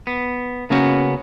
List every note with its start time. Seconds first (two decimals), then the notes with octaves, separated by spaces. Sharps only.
0.07 B3
0.70 C#3 A#3 B3 C#4 F#4